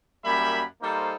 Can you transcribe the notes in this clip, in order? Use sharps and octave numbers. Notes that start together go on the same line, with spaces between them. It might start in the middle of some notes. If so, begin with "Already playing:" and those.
F#2 G3 A#3 E5 B5
G3 A#3 D#4 A4 C5